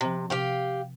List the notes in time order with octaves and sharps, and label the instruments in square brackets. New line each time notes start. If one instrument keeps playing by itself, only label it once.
[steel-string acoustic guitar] C3 [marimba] F3 C4
[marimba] C3 [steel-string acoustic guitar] G4 F5 G5